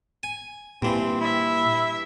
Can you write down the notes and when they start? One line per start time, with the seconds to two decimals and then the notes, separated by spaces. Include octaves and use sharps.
0.23 G#5
0.82 G2 A#2 E3 C4
1.21 E4 E5